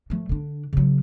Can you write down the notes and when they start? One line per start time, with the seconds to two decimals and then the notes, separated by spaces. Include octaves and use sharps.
0.10 F3 A3
0.29 D3 D4
0.73 C#3 F#3